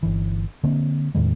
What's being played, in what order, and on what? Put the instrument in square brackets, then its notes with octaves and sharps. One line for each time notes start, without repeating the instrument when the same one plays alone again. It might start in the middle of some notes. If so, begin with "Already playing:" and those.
[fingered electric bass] G1 E3
D3 A#3 C4
E2 A2 D#3 G#3